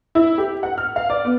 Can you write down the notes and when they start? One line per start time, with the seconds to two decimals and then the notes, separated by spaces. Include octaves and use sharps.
0.15 E4
0.38 G4
0.63 F#5
0.78 F6
0.96 F5
1.10 D5
1.25 B3